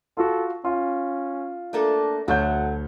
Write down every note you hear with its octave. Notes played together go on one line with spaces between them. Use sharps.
F4 F#4 A4
C#4 F4
A3 A#3 D4 A4
D2 F#3 A3 C#5 F#5 G6